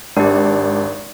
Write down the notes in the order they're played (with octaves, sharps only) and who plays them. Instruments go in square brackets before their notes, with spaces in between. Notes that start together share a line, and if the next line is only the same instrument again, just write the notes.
[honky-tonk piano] G#1 [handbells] D4 G4